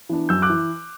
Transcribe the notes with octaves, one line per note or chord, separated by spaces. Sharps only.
E3 B3 D4
F#2 E6 G6
D6 F#6
E3